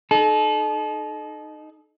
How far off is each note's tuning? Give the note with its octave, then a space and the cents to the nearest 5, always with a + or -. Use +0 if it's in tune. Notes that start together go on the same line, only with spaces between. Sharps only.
D#4 -20 A4 -35